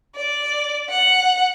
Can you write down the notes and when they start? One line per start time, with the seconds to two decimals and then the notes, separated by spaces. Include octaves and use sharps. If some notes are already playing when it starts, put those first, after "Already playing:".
0.15 D5
0.89 F#5